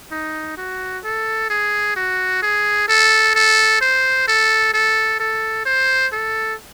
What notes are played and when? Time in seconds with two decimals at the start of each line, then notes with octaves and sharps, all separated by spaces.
0.12 D#4
0.57 F#4
1.04 A4
1.50 G#4
1.96 F#4
2.43 G#4
2.88 A4
3.35 A4
3.81 C5
4.28 A4
4.74 A4
5.20 A4
5.66 C5
6.13 A4